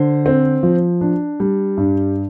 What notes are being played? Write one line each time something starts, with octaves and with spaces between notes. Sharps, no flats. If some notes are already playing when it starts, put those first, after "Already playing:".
Already playing: D3 C5
C4
F3
D4
G3
G2